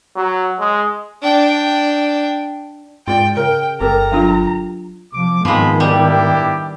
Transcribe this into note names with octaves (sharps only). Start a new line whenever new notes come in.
F#3
G#3
D4 G5
G#2 F4 D5 G5
C#3 A#4 G5
G1 G4 A4 A#4 A#5
F#3 D4 F4
C3 F3 D6
G#2 D#3 F3 G#3 B3 C4 B5
G3 D4 E4 G4